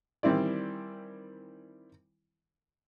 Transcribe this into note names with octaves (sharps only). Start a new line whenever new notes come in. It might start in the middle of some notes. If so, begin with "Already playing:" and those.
D#3 E3 G3 C4 E4 D5